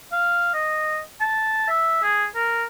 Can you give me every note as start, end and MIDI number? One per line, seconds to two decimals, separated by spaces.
0.12 0.49 77
0.54 1.00 75
1.20 1.68 81
1.68 2.01 76
2.03 2.25 68
2.35 2.64 70